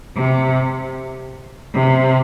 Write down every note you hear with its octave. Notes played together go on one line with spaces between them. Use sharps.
C3
C3